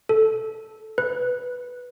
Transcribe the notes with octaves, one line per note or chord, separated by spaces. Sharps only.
A4
B4